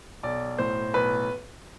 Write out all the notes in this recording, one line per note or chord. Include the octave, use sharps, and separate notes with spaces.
B1 D5
A2 C5
B1 B4